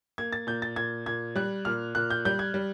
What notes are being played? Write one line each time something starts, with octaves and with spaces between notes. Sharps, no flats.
A#3 G#6
A6
A#2 G6
A6
A#2 G#6
A#2 G#6
G3 F#6
A#2 F6
A#2 F#6
G6
G3 G6
G#6
G3